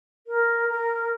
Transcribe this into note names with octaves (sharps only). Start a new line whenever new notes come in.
A#4
A#4